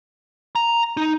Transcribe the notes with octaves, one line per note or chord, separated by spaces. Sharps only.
A#5
D#4